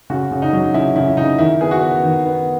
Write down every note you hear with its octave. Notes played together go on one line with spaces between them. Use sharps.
C#3 F#4
C#3
D#4
F#3
C#3 E4
C#3 E4
E4
C#3 D#4
D#3 E4
B3 G#4
F#4
B3
D#3
B3